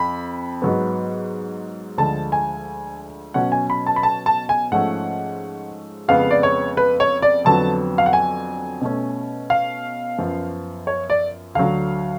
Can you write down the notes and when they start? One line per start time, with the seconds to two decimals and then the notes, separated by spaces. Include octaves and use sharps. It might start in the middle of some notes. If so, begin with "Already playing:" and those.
Already playing: F2 B5
0.62 G#2 F#3 B3
1.98 D2 D3 F3 G#3 A5
2.32 G#5
3.34 B2 F#3 C#4 F#5
3.52 G#5
3.70 B5
3.87 A5
3.96 B5
4.03 A5
4.26 A5
4.49 G#5
4.72 G#2 F3 A3 C#4 F#5
6.08 F2 C#3 G#3 B3 F5
6.31 D5
6.43 C#5
6.77 B4
7.00 C#5
7.22 D5
7.45 F2 D3 F#3 B3 A5
7.98 F5
8.06 F#5
8.13 G#5
8.81 B2 A3 C#4
9.50 F5
10.18 F#2 F3 B3
10.87 C#5
11.10 D5
11.55 D2 D3 F#3 F5